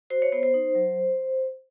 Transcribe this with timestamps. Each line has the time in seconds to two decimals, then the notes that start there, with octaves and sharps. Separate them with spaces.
0.10 F#4 C5
0.22 C#5
0.32 B3 C5
0.43 C5
0.54 D#4
0.75 F#3